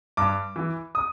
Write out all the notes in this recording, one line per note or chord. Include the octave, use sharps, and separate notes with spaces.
G2 D6
E3
D#6